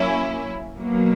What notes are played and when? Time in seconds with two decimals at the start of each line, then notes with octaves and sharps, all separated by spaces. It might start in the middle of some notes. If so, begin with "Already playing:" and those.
Already playing: F#3 A#3 C#4 E4
0.79 B2 F#3 A#3